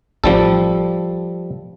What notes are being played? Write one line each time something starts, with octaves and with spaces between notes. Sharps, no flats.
A1 F3 G3 A4